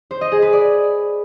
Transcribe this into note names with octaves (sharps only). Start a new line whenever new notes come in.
C5
D#5
G#4
B4
D5